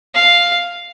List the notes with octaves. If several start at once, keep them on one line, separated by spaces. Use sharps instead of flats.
F5